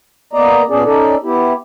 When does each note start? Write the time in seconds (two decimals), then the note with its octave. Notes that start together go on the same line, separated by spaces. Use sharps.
0.33 A#3 B3 D5 D#5 A#5
0.69 A#2 B3 C#4 D4 G#4 D5
0.84 C#4 D#4 A4 D5
1.23 B3 E4 G4